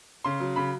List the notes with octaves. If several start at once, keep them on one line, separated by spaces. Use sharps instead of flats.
C#3 C6
F#3
C#3 B5